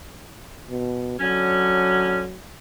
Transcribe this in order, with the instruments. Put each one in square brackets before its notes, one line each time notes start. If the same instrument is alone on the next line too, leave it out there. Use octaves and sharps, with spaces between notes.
[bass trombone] B2
[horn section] D3 C#4 [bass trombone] F#3